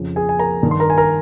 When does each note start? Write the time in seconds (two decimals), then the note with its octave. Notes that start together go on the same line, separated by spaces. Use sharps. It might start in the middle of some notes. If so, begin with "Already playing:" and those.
Already playing: F2 C#3 F3
0.16 G#4 G#5
0.29 G#5
0.39 A#4 A#5
0.63 G2 D#3
0.71 C6
0.80 A#4 A#5
0.90 G#5
0.98 A#4 A#5